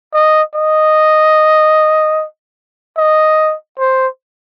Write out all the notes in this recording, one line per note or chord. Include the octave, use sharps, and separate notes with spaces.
D#5
D#5
D#5
C5